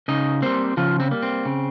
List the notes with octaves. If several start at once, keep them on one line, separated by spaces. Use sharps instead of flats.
C#3 D#4 D#5
G3 A#3 C4 C5
C#3 F3 F4
C4
G3 A#3
C4
C#3